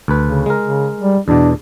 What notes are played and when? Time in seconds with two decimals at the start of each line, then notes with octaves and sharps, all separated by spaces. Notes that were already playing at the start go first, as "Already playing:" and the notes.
0.08 D2 B4
0.26 C#3
0.46 G#3 A#4
0.64 C#3
1.01 G3
1.28 E2 B2 D4